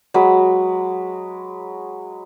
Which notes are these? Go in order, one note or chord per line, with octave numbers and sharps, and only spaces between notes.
F#3 G#3 B4